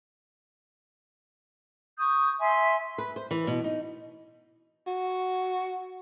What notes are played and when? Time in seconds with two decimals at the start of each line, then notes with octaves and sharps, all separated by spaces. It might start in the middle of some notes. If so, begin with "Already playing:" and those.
1.99 C#6 D#6 G6
2.39 E5 G#5 C6
2.98 B4
3.16 C5
3.31 E3
3.47 B2
3.64 D#4
4.87 F#4